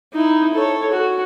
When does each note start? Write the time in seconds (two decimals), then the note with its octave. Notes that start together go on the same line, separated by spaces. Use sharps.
0.13 D#4 E4
0.54 A4 C#5
0.92 F#4